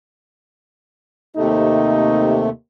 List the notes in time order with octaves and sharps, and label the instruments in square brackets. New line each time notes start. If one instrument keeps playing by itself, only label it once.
[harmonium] D#2 C3 A3 [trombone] D#4